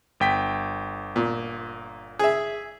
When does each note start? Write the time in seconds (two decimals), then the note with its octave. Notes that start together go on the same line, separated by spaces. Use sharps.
0.20 G1 G5 B6
1.16 A#2
2.19 G#4 E5